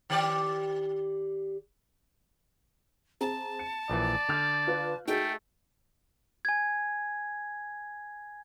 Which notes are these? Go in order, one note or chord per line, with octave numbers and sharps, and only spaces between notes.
D#3 G4 D5
C4 G#4 A5 A#5
C#7
A#1 A#2 E3 D5
D3 F6 G6 F7
F4 B4 F#6
A3 D#4 F#4 G#4 G5
G#5 G#6